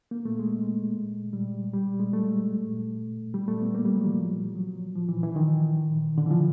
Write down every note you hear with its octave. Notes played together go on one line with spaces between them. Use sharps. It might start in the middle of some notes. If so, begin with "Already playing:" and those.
A#3
A3
G#3
G3
G3
G#3
A3
G3
A3
B3
A#3
G3
F#3
E3
F3
F#3
F3
E3
E3
D#3
D3
E3
F3